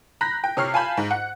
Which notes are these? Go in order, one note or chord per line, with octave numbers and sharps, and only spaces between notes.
A#5 B5 F#6 G6 A#6 B6
G5
C3 C#5 F6 C7
F5 G#5 A5 B5 G6
G#2
F#5